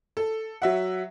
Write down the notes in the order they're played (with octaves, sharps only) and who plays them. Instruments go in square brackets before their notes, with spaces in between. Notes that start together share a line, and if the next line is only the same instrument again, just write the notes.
[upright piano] A4
F#3 E5 F#5